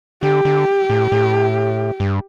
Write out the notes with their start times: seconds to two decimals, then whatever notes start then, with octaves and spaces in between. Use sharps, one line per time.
0.23 D3 G4
0.45 D3
0.90 A2
1.12 A2
2.00 G2